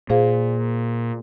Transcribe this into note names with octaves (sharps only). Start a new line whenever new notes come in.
A#2 G#4 C5 F5